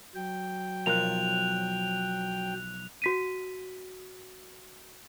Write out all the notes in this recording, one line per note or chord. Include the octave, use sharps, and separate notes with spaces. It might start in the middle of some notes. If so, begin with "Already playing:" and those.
F#3 G5
B1 F3 A#4 F#6 F7
F#4 B6 D#7